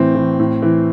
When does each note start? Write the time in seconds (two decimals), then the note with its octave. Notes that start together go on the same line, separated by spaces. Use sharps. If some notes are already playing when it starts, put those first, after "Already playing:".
Already playing: A2 E3 C4
0.15 E3
0.40 A2
0.62 E3